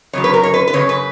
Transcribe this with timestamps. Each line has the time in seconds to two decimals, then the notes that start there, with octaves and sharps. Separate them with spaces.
0.13 F#2 C#3 F#3 C#5
0.24 B4
0.34 A#4
0.43 C#5
0.54 B4
0.68 B4
0.74 F#2 C#3 C#5
0.89 B4